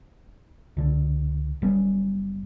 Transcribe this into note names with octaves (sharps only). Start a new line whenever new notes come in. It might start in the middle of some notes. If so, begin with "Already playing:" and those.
C#2 D3
F#1 G3 B3 C#4